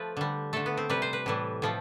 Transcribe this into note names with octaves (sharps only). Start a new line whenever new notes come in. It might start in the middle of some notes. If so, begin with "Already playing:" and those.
Already playing: F3 A3 B4
D3 G3
D3 A3 A4
B3
C4
C3 G3 B4
C5
B4
A2 E3 G3
A2 F3 A3